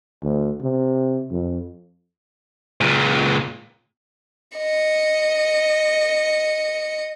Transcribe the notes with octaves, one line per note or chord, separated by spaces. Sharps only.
D2
C3
F2
C#2 A#2
D#5 C#7